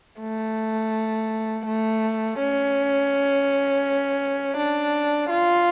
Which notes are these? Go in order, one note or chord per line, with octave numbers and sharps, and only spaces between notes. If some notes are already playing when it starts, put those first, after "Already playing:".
A3
A3
C#4
D4
F4